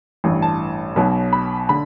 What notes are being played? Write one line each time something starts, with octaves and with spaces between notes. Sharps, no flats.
A1 G2 E3
A5
B1 B2 F#3
B5
D3 B5